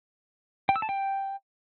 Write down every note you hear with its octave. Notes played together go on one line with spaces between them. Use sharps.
G5
E6
A5
G5